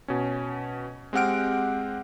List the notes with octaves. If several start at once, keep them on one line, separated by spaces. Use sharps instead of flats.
B2 C#4
G#3 C4 G4 F#5 F6 D7